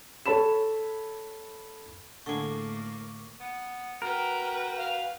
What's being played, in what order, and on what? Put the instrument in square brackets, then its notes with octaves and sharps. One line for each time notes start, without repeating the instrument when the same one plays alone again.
[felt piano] A4 C#5 A5 B5 E7
[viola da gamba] A2 A#3 [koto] D3 G#4 [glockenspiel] C#6 D6
[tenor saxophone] B3
[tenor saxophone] F#4 [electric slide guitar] A#4 [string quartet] B4 G5
[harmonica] F5